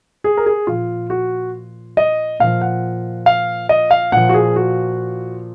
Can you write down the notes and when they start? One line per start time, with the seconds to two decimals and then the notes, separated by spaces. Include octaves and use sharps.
0.24 G#4
0.37 A#4
0.46 G#4
0.67 A#2 F3 F4
1.10 F#4
1.97 D#5
2.40 A#2 F3 F5
2.61 F#5
3.26 F5
3.69 D#5
3.91 F5
4.12 A#2 F3 F#5
4.29 F#4
4.34 G#4
4.56 F#4